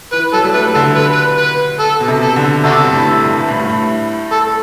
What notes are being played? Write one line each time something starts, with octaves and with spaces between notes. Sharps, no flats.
E3 B4
F#3 A4
G3
A3 B4
D3 A4
B4
B4
B4
A4
B2
C3
A4
D3
C3 D4 F#4 A4
G2
A2
G2
A2
G2
A2
A4